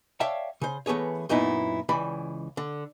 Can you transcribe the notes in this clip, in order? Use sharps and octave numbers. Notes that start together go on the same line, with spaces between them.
C#5 D5 E5 F5 G5 A5
C#3 C5
E3 A3 B3 G#4 C#5
F#2 A#2 B3 D#4 E4
C#2 E3 D5 B5
D3